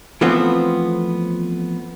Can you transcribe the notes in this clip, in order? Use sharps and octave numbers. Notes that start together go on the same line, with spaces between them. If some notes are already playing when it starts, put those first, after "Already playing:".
E3 F3 A3 B3 C4